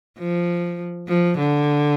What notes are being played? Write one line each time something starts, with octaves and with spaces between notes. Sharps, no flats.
F3
F3
D3